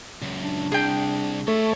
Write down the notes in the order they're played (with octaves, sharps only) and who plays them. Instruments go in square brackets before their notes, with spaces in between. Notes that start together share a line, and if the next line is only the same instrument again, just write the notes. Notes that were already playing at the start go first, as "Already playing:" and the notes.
[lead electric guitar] C#2 F#2
[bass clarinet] D4
[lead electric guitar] C2 [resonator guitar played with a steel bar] G#4 G5
[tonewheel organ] A3 [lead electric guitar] C#5 E5